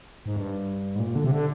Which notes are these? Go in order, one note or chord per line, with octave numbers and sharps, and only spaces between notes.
G#2
G2
G#2
A#2
D3
C3
D3